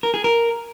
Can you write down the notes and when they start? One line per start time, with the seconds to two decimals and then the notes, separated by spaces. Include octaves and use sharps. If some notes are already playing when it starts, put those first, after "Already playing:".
0.03 A#4
0.14 G#4
0.24 A#4